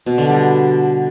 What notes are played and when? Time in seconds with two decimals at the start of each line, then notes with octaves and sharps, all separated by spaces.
0.06 B2
0.18 D3
0.30 G3